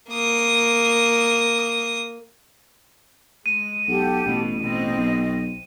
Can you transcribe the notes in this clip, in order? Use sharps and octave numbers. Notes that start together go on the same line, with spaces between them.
A#3 D#6
G#3 D#7
B1 G4 A4 F#5
A1 B2
B2 C4 D#5
B1